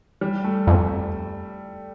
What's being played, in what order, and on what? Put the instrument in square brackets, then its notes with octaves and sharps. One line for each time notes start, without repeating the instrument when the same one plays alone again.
[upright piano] G3
A3
[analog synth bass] F2